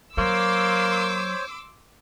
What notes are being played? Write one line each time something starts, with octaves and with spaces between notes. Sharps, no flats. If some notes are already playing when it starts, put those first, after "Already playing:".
F#3 A#3 C5 C#5 C6 D6 E6